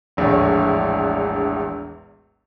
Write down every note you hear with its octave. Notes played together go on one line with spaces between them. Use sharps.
E1 A#1 E2 A2 C#5